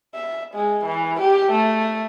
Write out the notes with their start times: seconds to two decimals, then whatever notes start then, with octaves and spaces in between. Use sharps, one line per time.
0.15 E5
0.54 G#3
0.85 E3
1.20 G4
1.52 A3